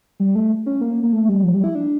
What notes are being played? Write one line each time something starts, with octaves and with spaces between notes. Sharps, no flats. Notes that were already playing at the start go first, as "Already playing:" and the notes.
G3
A3
C#4
A#3
A#3
A3
G3
F3
G3
E4
D4